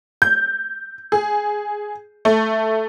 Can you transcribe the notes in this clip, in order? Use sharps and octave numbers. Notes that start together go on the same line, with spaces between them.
G6
G#4
A3